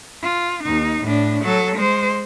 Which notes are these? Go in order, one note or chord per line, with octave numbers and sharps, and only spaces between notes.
F4
D#2 D#4
A2 D4
F#3 A4
G#3 C5